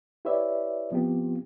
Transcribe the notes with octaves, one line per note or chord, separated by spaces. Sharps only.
E4 G4 B4 C#5 D5 E5
F3 B3 C4 F4 G4